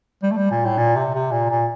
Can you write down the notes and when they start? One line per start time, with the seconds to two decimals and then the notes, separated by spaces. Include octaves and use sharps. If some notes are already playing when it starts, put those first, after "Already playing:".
0.23 G3
0.31 A3
0.37 G3
0.51 A#2
0.65 A2
0.78 A#2
0.96 C3
1.15 C3
1.32 A#2
1.50 A#2